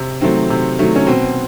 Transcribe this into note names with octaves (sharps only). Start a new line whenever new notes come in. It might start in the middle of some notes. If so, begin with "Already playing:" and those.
Already playing: C3
D#3 F#3 A3 C4
C3
D#3 F#3 A3
C#4
B2 C4